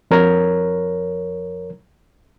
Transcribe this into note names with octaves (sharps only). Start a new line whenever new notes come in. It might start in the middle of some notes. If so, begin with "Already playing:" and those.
F2 A#4 C#5 A#5